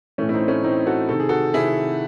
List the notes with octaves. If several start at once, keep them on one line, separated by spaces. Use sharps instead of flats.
A2 E3 A3 C#4
E4
C4 D#4
A3 C#4
A2 E3 C4 D#4
F#4 A4
C3 D#3 A4
G#4
F#4 A4
C3 D#3 E4 G#4